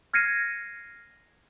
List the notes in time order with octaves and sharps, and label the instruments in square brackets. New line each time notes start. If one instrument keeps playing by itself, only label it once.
[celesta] F6 G#6 A#6 C7 C#7 D#7